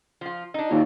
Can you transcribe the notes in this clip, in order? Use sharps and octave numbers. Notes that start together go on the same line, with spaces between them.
F3 F4
D4 D#4
D#2 F#3 F4